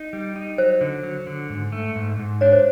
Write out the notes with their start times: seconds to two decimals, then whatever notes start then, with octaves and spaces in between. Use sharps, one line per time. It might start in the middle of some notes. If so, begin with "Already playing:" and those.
Already playing: D#4
0.13 G3
0.36 D#4
0.58 F#3 C5
0.81 D3
1.03 F#3
1.27 D3
1.50 G#2
1.72 A3
1.96 G#2
2.19 G#2
2.41 D4 C#5
2.52 C5